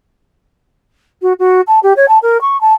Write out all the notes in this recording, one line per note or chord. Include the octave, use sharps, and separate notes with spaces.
F#4
F#4
A5
G4
C#5
A5
A#4
C#6
A5